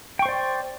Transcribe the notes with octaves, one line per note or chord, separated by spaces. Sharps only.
C5 D5 G5 C#6